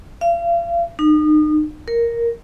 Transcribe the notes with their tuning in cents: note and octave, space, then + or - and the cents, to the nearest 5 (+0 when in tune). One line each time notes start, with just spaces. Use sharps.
F5 -35
D#4 -35
A#4 +0